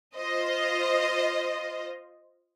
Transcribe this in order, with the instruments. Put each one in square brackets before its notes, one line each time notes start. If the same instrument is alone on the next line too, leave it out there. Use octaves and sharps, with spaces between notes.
[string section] F4 C5 D#5